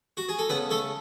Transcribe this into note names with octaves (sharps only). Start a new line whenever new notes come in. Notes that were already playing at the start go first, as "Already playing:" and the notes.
F#4
G#4
A4
C#3 B3 B4
A3 A4